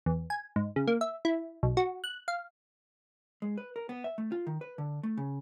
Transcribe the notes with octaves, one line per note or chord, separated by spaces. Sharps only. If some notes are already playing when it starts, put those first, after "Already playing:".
E2
G#5
G#2
C#3
A#3
E5
E4
B1
F#4
F#6
F5
G#3
B4
A#4
B3
E5
A3
F4
D#3
B4
D3
A3
C#3